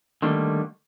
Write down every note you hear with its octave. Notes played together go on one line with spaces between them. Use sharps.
D3 D#3 G3 A3 A#3